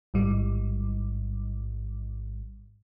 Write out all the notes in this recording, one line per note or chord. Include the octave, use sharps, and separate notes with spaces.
A1 G#2 G3